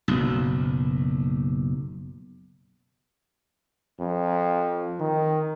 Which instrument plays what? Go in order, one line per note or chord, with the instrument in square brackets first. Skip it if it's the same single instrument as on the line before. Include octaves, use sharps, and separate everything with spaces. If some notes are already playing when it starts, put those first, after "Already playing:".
[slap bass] F#1 B1
[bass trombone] F2
D#3